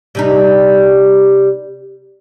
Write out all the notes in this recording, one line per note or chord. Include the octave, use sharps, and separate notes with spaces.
C3 G3 D#4